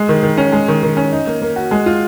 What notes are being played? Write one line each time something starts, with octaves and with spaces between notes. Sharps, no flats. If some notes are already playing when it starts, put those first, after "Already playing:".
Already playing: G#3
D#3
D#3
C#4
G#3
D#3
D#3
C#4
D#4
A#3
A#3
F#4
G#3
F4